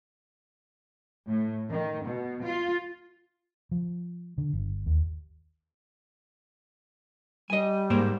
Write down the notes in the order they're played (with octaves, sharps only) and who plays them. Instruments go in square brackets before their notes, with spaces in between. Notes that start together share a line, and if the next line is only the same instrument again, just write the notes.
[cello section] A2
D#3
B2
F4
[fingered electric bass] F3
D3
G1
D#2
[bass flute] G3 [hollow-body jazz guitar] D#5 G#5
[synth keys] G#2 [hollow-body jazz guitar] A#3 A#4 C5